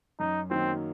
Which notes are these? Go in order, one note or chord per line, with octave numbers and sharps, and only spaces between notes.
F#2 D#4
D#3 F#3 A#3 C4